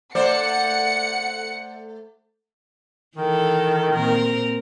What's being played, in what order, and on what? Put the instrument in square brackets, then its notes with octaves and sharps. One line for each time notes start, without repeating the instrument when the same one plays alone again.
[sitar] A3 C5 D5 [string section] F#5 C#7
[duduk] D#3 [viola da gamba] E3 A4
[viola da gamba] A#2 C4 A#4